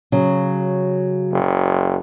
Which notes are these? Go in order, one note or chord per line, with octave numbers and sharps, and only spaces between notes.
C#3 F#3
F#1